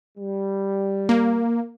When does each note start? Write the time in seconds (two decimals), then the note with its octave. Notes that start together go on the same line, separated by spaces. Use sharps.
0.18 G3
1.09 A#3